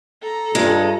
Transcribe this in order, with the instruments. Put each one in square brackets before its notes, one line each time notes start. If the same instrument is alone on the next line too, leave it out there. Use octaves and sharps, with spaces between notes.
[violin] A4 A#5
[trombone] G2 [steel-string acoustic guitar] G#3 [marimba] F4